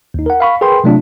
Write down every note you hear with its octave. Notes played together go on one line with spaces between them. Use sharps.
D#2 D#4
A#4 F#5
F5 B5 C#6
G#4 A#4 B4 G5 B5 C6
C3 F#3 A3 C4 D4 F4